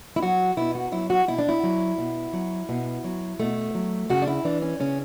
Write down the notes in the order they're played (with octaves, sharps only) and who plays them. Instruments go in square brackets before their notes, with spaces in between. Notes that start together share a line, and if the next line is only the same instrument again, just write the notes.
[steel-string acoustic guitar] E4
F#3 F#4
B2 E4
F#4
F#3 E4
F#4
B2 E4
D4
E4
F#3
B2
F#3
B2
F#3
B2 A3
F#3
C#3 F#4
D4
E4
E3 D4
C#4
C#3 C#4